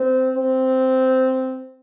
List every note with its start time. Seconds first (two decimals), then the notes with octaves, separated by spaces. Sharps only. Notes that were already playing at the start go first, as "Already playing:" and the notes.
Already playing: C4
0.36 C4